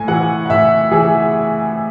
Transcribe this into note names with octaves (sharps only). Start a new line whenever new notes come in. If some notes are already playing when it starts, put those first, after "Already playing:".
Already playing: A2 G#5
E3 F#5
F#5
A2 E5
E3 G#4